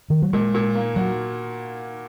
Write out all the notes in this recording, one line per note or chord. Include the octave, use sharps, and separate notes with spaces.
D#3
F#3
A#2 G#3
A#2
A#3
F#3 F#4